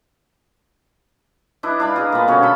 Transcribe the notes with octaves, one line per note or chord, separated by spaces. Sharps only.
D4 E4 B4 D#5
D4 F5 B5
G#4 D#5 A#5
A#2 B3
B2 D3 C#4
A4 B5